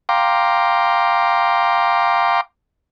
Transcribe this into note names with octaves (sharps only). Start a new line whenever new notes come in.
F5 G5 A#5 C6 D6